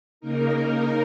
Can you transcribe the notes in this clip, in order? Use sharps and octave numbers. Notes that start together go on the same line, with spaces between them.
C#3 A#3 D#4 A#4